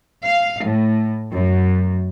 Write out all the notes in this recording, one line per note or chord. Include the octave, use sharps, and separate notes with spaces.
F5
A2
F#2